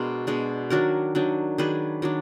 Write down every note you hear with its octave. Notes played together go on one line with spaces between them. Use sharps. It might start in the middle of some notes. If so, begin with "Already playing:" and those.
Already playing: B2 G#3 D4 A#4 D5
B2 G#3 D4
D#3 F#3 D4 F#4 A#4
D#3 F#3 D4
D#3 F#3 D4 G#4 B4
D#3 F#3 D4